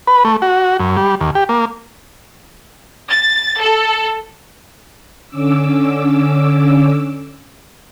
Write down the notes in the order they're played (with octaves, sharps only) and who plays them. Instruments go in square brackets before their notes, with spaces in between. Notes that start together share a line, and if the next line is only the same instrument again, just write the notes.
[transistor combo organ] B4
A3
F#4
F#2
G3
D#2
G4
A#3
[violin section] A6
A4
[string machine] D3 C#4 D6 E6